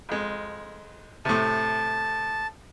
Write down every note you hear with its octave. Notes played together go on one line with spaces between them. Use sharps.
F2 G#3
A2 C3 A5